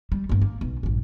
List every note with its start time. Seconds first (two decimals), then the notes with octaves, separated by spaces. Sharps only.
0.12 G3
0.29 G2 A#3
0.42 A#3
0.61 B1 C#3
0.83 A#1 G2